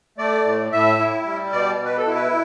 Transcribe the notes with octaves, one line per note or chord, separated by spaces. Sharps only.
A3 D5
A2
A2 E5
E4
G3
B2 D5
B2
B4
A4
E4
B4